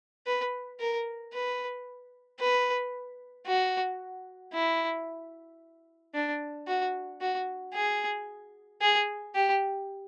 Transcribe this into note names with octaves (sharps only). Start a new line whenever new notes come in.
B4
A#4
B4
B4
F#4
E4
D4
F#4
F#4
G#4
G#4
G4